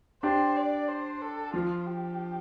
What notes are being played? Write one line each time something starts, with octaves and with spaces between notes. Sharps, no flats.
D4 G4 C5
D5
C5
A4
F3 F4
G4